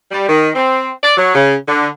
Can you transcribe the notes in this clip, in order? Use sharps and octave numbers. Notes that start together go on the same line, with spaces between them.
G3
D#3
C4
D5
F#3
C#3
D3